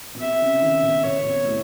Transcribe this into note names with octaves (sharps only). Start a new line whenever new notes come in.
B2
C3 E5
C#3
D#3
B2
B2 C#5
C3
B2
A2